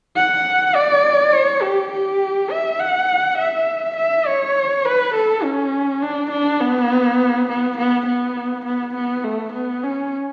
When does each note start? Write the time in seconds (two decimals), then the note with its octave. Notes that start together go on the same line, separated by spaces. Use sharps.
0.16 F#5
0.75 D5
1.33 C#5
1.62 G4
1.92 G4
2.51 E5
2.80 F#5
3.38 E5
3.97 E5
4.27 C#5
4.85 B4
5.15 A4
5.43 C#4
6.03 D4
6.31 D4
6.60 B3
7.48 B3
7.78 B3
8.07 B3
8.65 B3
8.95 B3
9.24 A3
9.53 B3
9.83 C#4